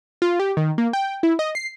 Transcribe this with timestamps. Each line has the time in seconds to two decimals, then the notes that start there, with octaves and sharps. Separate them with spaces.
0.22 F4
0.39 G4
0.57 D#3
0.78 A#3
0.93 G5
1.23 E4
1.39 D#5
1.55 C7